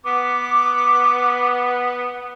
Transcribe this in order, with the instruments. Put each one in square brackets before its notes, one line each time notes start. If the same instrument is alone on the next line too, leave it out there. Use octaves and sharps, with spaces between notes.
[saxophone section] B3 [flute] D6